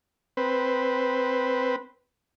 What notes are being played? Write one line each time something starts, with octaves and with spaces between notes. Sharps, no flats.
C4 B4